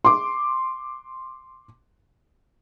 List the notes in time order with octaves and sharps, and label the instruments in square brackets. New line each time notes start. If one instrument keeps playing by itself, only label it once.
[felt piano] C6 D6